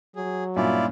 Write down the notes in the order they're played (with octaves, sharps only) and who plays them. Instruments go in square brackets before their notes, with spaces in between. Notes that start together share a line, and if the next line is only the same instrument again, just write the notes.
[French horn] F#3 [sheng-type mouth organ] G#4
[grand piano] G2 A#2 C#4 [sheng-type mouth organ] E4 F4 D5